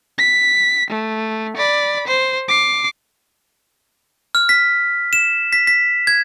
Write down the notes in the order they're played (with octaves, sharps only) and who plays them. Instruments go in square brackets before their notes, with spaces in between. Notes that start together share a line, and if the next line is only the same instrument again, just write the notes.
[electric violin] B6
A3
D5 B5
C5
D6 C7
[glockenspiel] F6
B6
E7
B6
B6
G#6